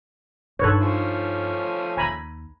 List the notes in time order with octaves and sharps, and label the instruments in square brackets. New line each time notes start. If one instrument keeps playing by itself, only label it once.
[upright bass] G2 D#4 [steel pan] A4 B4 C#5
[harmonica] F3 A3 C#4
[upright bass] D#2 [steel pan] G#5 A#5 B5